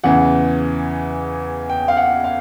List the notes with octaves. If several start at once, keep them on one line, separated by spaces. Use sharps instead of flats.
E2 C#3 E3 F#5
G5
F5
F#5
F5